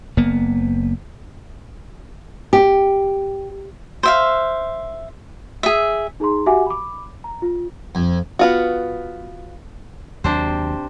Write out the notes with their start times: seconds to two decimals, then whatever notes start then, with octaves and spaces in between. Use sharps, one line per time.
0.17 F#1 A#3 B3
2.53 G4
4.03 C5 E5 F5
5.63 G#4 E5
6.20 D#4 G#4 A#5 C6
6.46 F#4 G4 E5 F#5 G#5 D6
6.66 B5 D6
7.24 A#5
7.42 F4
7.95 F2
8.39 B3 F4 F#4
10.24 D#2 C3 F#3 D4 C5